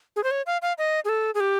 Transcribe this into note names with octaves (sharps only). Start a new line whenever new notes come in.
G#4
C5
C#5
F5
F5
D#5
G#4
A4
G#4
G4